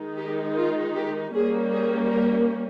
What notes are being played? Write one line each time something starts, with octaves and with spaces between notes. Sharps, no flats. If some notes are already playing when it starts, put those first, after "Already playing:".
Already playing: D#3 G#3 D#4
G4
F4
G4
G3 A#3 C#4 G#4
G#4
A#4